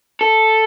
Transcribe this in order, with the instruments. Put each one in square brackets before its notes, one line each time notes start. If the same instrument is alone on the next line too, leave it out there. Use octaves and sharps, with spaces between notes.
[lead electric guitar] A4